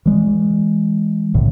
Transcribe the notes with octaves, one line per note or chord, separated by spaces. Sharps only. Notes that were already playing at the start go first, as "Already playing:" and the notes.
E3 G#3
C2 A2 D3 E3